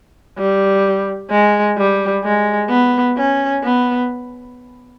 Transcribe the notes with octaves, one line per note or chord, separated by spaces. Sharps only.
G3
G#3
G3
G#3
B3
C#4
B3